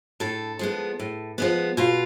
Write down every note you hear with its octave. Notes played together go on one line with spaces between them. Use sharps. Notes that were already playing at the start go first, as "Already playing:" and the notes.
A2 A4
F3 G#3 B3
A2
F3 G#3 B3
B2 F4